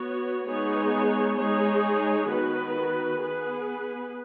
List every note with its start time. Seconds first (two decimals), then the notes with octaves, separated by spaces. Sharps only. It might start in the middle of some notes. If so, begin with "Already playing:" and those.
Already playing: B3 F#4 C#5
0.48 G#3 B3 D#4 G#4 C#5
1.38 G#3 D#4 G#4 C#5
2.29 D#3 B3 F#4 B4
3.21 B3 G#4 B4